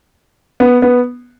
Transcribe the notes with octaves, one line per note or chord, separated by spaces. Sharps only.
B3
B3